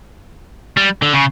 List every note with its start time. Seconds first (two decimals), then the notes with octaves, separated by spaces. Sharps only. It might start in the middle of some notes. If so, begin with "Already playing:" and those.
0.77 G3
1.02 D3
1.14 C#3